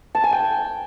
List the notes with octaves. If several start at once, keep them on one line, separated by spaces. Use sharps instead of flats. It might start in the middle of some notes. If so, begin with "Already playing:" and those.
A5
G#5
G5